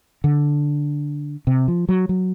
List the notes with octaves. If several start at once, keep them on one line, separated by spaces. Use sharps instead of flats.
D3
C3
F3
F#3
F#3